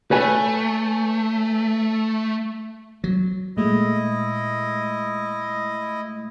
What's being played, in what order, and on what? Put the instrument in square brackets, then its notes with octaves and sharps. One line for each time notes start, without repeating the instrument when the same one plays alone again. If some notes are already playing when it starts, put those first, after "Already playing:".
[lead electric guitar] A3 [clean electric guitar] B4 C#5 G#5
[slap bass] F#3
[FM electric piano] A#2 G#3 A3 [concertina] E4 D#5